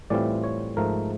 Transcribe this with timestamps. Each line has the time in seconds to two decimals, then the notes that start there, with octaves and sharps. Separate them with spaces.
0.10 A2 E3 G3 C4 F4 D5
0.44 C#5
0.77 G#2 F3 A3 A#4